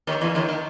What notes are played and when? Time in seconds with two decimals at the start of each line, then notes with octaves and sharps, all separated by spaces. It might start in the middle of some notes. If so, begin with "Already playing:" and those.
0.07 D#2 D#3
0.21 E2 E3
0.35 D#2 D#3
0.49 D#3